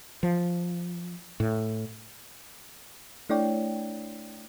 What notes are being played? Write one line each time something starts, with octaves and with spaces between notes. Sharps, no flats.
F3
A2
A3 D4 E4 C#5 D5 G5